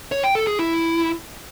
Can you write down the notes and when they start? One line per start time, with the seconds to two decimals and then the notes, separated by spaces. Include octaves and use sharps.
0.12 C#5
0.23 G5
0.35 A4
0.47 G#4
0.59 E4